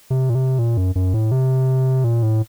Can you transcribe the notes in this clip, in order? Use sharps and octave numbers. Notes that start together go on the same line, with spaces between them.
C3
A#2
C3
A#2
F#2
F#2
A2
C3
A#2
A2